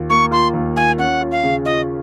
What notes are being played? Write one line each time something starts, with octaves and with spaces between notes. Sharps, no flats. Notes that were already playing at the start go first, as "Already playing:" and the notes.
Already playing: D#2 F4
A#3 C#6
F4 C6
D#2
F4 G#5
C#4 F#5
F4
F5
C#3
F4 D#5